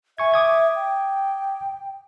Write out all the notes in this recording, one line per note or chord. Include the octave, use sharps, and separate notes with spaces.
E5 G#5 C#6 G#6
D6 D#6 G#6
G5